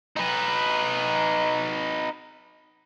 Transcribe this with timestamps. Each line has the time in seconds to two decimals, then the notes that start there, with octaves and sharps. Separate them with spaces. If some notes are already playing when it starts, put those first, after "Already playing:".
0.17 D#4 B4